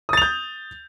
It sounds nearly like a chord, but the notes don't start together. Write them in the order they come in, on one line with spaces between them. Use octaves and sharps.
D#6 A6 F7 G6